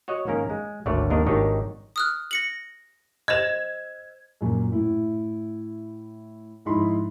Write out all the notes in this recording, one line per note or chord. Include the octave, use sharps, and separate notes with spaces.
F#4 C#5 D#5 F#5
G#2 D#3 A#3 C#4 A#4
G#3
G#1 D2 A3 C#5 D5
D#2 D4 A#4 D#5
G#1 D#3 D4 D#4 G4 C#5
D#6 F6 F#6
A#6 C#7 F#7
C5 D#5 G#6 E7
F#2 A#2
A2 E4
G#2 F3 D#4 E4 B5 C6